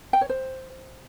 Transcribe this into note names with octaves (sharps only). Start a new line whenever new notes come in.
G5
C#5
C5